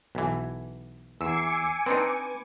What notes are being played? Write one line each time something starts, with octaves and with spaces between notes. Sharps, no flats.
B1 E3
E2 G#5 D6 E6 C7 C#7
C4 D4 D#4 B4